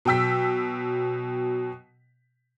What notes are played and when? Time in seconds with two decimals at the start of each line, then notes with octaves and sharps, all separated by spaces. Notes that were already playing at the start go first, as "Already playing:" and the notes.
0.05 B2 F#3 G5 E6 B6